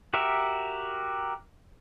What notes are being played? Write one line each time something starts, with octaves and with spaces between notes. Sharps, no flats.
F#4 G4 A#4 E5